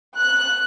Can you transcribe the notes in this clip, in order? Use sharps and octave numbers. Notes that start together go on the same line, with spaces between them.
F#6